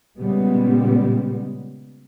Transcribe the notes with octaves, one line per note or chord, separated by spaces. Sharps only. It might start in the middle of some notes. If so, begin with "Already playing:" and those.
A#2 C#3 G3 G#3 B3